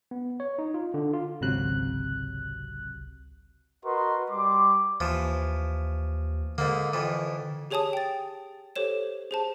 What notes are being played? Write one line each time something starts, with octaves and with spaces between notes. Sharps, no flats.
B3
C#5
D#4
F4
D3
F4
G#1 C#2 C3 F#3 F#6
F#4 A#4 B4 D#5 C6
G3 C6 D6
D#2 E3 F3
G#2 D3 A#3
F2 E3
G4 G#4 C#5 G#5 A5 D#6
G5 A6
G4 A4 C5 C#5 E7
G#4 C5 A5